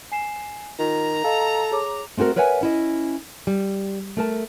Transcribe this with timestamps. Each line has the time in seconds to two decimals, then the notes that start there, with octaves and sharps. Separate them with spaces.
0.12 G#5 C7 E7
0.79 D#3 F4 A#5
1.24 A4 D#5 F5
1.72 G#4 C#5 D6
2.17 A3 C4 F#4 G4 A#4
2.36 A#4 B4 C#5 E5 F#5 G#5
2.61 C#4 E4 D#5
3.47 G3
4.17 A3 A#4 A5